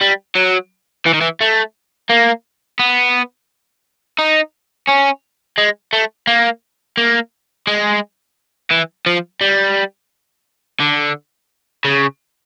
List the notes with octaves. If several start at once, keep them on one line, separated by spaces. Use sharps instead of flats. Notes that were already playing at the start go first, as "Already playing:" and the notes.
G3
F#3
E3
D#3
E3
A3
A#3
B3
D#4
C#4
G#3
A3
A#3
A#3
G#3
E3
F3
G3
D3
C#3